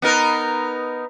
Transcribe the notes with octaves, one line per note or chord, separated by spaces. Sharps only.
B3 D#4 A#4